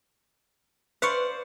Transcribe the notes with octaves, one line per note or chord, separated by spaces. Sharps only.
B4 C5 D5 F5 C#6